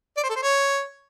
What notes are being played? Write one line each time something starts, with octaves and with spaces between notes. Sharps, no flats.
D5
C5
A4
C5
C#5